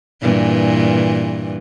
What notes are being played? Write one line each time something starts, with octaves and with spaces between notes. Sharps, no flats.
G2 A#2 E3